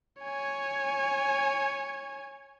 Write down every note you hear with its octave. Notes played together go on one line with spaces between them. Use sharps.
C#5 G#5